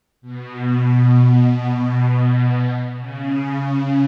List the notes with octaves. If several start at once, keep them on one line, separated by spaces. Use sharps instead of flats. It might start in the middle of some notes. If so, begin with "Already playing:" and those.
B2
C#3